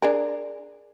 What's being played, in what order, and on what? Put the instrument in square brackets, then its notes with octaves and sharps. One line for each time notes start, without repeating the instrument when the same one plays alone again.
[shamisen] D4 G#4 A#4